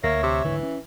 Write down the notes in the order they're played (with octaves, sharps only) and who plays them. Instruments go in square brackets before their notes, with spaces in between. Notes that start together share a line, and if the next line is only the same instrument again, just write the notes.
[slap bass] D2 [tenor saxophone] A#3 [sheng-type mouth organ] C#5 E5
[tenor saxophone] C3
[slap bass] D1 G#1 D3 [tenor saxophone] E3
[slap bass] C#4